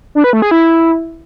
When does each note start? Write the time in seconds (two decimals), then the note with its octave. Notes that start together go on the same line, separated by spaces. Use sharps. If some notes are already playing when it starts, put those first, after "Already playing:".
0.15 D4
0.24 B4
0.33 A3
0.42 G#4
0.51 E4